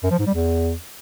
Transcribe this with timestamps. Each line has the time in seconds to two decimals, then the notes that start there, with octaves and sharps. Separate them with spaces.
0.03 F#2
0.11 F3
0.19 G#2
0.27 G3
0.34 E2